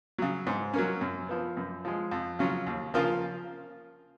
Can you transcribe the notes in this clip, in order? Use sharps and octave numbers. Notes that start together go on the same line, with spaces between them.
C#3 F#3
G#2
F#3 A#3 C#4
F#2
F3 B3
F#2
F3 G#3
F2
C#3 F#3 C#4 F4
D#2
C#3 F3 A#3 F4